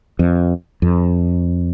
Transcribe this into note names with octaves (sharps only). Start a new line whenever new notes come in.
F2
F2